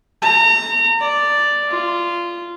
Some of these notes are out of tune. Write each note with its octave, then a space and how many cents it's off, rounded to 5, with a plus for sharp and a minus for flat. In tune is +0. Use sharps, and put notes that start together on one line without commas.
A#5 -35
D5 +0
F4 -15